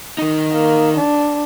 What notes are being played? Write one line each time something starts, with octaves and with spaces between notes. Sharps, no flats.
D#3 D#4
A#3
D4